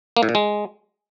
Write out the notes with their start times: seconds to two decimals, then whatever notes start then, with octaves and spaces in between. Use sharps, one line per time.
0.17 A#3
0.23 A2
0.29 A#2
0.35 G#3